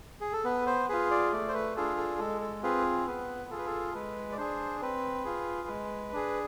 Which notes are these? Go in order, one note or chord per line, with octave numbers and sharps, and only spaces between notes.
G#4
A4
B3 B4
C5
F4 G#4 B4
D5
A3 D5
C5
B4
D4 F4 G#4 A4
A4
G#3 A4
A4
C4 F4 G#4 B4
B3 B4
F4 G#4 A4
B4
A4
G#3 B4
D5
D4 G#4 C5
C4 B4
F4 G#4
G#3
D4 G#4